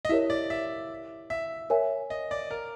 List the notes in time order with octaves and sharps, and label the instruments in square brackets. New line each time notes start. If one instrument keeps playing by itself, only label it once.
[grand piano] D#5
[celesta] E4 G4 A#4 C#5 [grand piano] E5
[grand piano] D5
E5
E5
[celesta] A#4 C#5 E5 G#5
[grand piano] D#5
D5
A#4